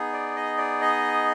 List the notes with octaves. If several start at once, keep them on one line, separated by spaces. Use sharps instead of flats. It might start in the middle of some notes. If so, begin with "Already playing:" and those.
Already playing: B3 D#4 G#4
D5
D#5
D5
D#5